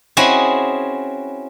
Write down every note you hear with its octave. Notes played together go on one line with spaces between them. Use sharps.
C4 C#4 E4 F#4 G#4 D#5